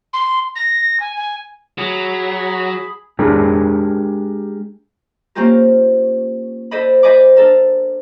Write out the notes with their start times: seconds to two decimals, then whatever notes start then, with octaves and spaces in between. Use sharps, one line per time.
0.13 C6
0.56 A#6
1.00 G#5
1.16 G#5
1.78 F#3 G#4 B5
3.19 G#3 D4 G4 G#4 A#4
5.35 A#3 C4 C#4 F4 G4 A#4
6.71 A4 C5 D5 D#5 B5
7.03 C5 D5 D#5 G#5 B5 D6
7.36 D4 A4 A#4